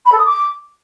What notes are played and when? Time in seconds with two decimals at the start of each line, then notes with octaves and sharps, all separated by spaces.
0.05 B5
0.12 A4
0.18 D#6
0.25 D6